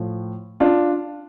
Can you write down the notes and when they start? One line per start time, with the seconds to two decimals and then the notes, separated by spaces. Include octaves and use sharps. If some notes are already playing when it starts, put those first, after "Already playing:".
Already playing: A2 F3
0.60 D4 F4